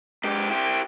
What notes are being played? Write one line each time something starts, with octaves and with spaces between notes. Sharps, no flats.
G#2 G4
E4 G4